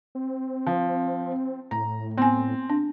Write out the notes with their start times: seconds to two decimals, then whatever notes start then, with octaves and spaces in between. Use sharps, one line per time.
0.15 C4
0.67 F3
1.71 A2 A#5
2.18 B3 C4 G#5
2.70 D4